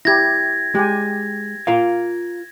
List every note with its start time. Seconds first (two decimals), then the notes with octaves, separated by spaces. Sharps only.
0.05 E4 G4 G#6 A#6
0.75 G#3 G4 G#5
1.67 F4 A#4 F5